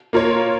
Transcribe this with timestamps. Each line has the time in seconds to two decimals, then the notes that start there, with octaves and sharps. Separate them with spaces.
0.13 A#3 F4 A#4 C#5